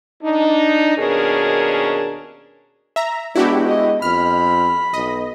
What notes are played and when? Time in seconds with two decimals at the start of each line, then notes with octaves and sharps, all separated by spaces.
0.23 D4 D#4
0.98 D#2 B2 C#4 D4 G#4 A#4
2.96 E5 A#5
3.36 G#3 B3 D4 E4 F#4 G4
3.68 D#5
4.02 F2 B5 F6
4.94 B1 D#5